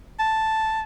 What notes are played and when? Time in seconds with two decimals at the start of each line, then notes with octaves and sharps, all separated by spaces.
0.19 A5